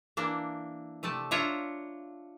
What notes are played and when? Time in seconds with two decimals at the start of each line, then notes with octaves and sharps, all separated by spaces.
0.17 E3 A#3 D4
1.03 C3 A3 D5 A5
1.31 D4 F4 C#5 E5 A#5